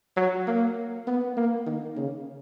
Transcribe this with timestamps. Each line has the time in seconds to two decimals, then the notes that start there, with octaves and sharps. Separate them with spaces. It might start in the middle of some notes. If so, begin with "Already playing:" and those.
0.17 F#3
0.47 A#3
1.07 B3
1.37 A#3
1.66 D#3
1.97 C#3